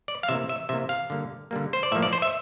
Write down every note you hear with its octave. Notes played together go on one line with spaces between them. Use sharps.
D5
F5
C3 E3 A#3 E5
E5
C3 E3 A#3 E5
F5
D3 G3 A#3
D3 G3 A#3
C5
D5
A2 F3 A#3 E5
D5
C5
E5